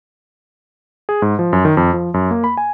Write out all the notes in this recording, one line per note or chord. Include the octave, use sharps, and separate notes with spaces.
G#4
G#2
F3
F#2
D#3
F2
F3
F#2
A#3
B5
G#5